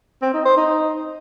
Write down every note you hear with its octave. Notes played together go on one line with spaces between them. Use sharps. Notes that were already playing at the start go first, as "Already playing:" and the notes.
C4
D#4
C5
D#4